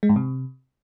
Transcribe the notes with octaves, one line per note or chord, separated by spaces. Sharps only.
G#3
G#2
C3